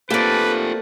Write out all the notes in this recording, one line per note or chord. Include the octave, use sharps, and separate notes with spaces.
A3 A#3 C4 F4 G4 B4 D5